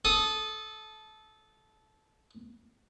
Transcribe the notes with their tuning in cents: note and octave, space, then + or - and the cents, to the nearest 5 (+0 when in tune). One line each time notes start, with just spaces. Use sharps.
A4 -20 D#6 +0